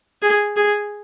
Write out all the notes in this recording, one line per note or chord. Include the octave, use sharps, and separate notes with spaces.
G#4
G#4